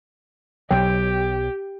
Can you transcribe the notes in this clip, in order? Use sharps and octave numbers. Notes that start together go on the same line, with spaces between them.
B1 F#3 G4 G5